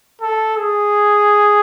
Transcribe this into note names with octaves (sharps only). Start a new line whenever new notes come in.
A4
G#4